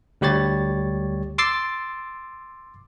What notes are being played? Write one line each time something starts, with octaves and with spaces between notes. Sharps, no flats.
D2 G3 G4 C#5 A6
C6 D6 E6 A6 C7